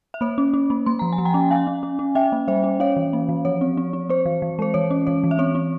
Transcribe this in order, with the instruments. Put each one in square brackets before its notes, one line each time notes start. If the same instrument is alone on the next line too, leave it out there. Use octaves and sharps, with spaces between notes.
[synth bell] E5
A#3 C#5
C#4
C#4
A#3
A#3 C6
F3 A#5
G#5
F3
G5 A#5
C#4
C#4 F5 G#5
C#4
C#4
C#4
C#4 E5 G5
A#3
G3 C5 E5
C#4
C#4 C#5 F5
E3
A#3
E3
F3 C#5
C4
C4
C4
C4 C5
E3
E3
G#3 C5
E3 C#5
C#4
E3 C#5
E3
E5
C4 C#5
C4